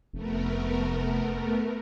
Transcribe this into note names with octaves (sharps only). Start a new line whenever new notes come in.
F1 A3 B3 A#4